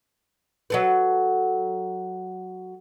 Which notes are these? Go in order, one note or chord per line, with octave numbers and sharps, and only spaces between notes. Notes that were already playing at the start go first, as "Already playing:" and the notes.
F#3 A4 B4